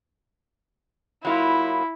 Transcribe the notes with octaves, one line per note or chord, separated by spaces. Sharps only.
F#3 A#3 E4 F4 B5